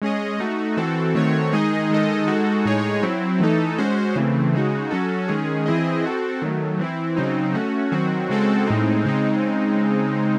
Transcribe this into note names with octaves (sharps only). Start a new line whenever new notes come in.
G#3 C#4 G#4 D#5
A3 D#4 F#4
E3 C4 F#4 A4
D#3 A3 C4 F#4 C#5
D#3 G#3 D#4 G#4 D#5
D#3 G#3 D#4 A4 D#5
G#3 D#4 F#4 A4
A2 G#3 D#4 G#4 C#5
F#3 C4 E4
E3 A3 D#4 A4
G#3 C#4 F#4 C5
C#3 E3 A3 C4
C#3 G#3 D#4 F#4
F#3 C#4 F#4 A4
D#3 G#3 C#4 G#4
E3 C4 E4 G#4 D#5
C4 F#4 A4
D#3 F#3 A3
E3 C4 E4
C#3 F#3 C4 D#4
A3 C#4 F#4
D#3 F#3 C4 F#4
C#3 G#3 C4 F#4 A4
A2 G#3 C4 D#4
C#3 G#3 C4 D#4